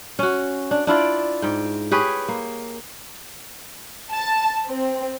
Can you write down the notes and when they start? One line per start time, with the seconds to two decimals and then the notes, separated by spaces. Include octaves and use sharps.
0.19 C#4 F#4
0.71 D4
0.87 D4 E4 F4 D5
1.42 G#2 G5
1.91 G4 G#4 B4 C#5
2.28 A#3
4.11 A5
4.68 C4